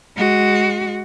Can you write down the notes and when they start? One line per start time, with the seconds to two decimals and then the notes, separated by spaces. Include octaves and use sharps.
0.16 G#3 F#4